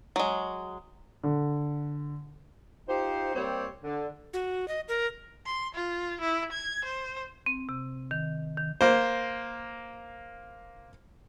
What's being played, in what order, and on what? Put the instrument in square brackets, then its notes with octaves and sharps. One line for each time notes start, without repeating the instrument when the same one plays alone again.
[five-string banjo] F#3 G#3
[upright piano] D3
[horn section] D#4 F4 G4 C5
G3 A#3 C4 C5 C#5
D3
[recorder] F#4
D#5
A#4
[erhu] C6
F4
E4
G#6
C5
[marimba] C4
C3
D#3
D#3
[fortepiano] A#3 C5